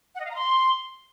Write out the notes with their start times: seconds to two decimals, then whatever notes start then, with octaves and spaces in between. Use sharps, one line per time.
0.15 F#5
0.20 D#5
0.25 F5
0.30 A#5
0.35 C6